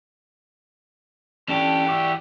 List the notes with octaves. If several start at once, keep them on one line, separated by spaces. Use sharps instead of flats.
E3 C#4 D4 G4 A4
F#4 D5 E5